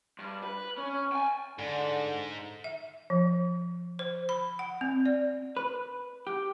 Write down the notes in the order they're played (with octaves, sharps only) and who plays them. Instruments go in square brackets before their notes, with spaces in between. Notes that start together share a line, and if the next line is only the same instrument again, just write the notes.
[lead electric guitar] G2
B4
C#4
G5 G#5
[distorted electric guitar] G#2 [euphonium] D3
[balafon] E5
F3
C5
B5
F#5
C4
D5
[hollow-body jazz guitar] B4
G4